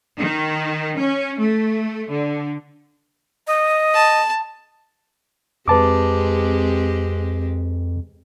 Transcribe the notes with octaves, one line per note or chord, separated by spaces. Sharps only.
D#3
C#4
A3
D3
D#5
A5
F2 G#3 C4 G4 B4 A5 D6